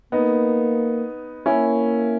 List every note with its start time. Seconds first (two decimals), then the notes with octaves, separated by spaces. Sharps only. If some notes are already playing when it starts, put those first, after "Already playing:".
0.12 A#3 B3 D#4
1.46 A#3 C#4 E4